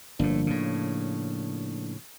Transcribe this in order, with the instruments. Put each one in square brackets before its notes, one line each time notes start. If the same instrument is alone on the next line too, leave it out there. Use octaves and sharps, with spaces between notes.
[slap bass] G1 A2 [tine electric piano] F3 A#3 D4
[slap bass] A2 C#3